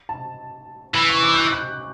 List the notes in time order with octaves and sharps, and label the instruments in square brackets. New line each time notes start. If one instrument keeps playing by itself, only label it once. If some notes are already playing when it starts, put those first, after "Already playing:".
[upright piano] A5
[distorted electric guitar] E3 [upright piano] B5
[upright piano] C#6
D6
G6
F#6
F#6